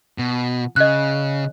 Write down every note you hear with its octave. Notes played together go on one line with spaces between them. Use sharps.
B2
C#3 D#5 F#6